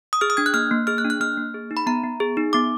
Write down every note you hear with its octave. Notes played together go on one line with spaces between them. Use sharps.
D#6
G#4 F6
D#6
D4 G#6
F#6
A#3 F6
A#3
G#4 F6
F#6
D4
F#6
A#3 F6
A#3
G#4
D#4
B5
B3 A#5
B3
G#4
D#4
B3 D6